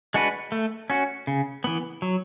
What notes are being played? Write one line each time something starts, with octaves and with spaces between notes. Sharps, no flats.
G#3 D4 F#4 B4
A3
C#4 F#4
C#3
E3 B3
F#3